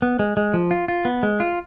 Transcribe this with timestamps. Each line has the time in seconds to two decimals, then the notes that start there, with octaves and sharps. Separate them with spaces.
0.02 B3
0.19 G#3
0.37 G#3
0.54 F3
0.71 F4
0.88 F4
1.05 B3
1.23 G#3
1.40 F4